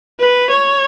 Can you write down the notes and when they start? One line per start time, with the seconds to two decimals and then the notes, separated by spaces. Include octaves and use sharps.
0.20 B4
0.50 C#5